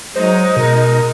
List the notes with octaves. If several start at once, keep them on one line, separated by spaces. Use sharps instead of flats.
F#3 G#3 D#4 C5
B2 A#4